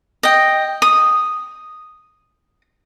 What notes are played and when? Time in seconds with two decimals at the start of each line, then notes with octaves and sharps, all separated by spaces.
0.23 D#5 G5
0.82 D#6